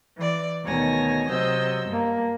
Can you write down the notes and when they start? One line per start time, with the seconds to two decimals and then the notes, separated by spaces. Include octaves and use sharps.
0.16 E3 D5
0.64 D2 B2 D#3 C#5 G#5 A#6
1.28 C3 F#3 C5 D#5 E6 G6
1.87 G2 A#3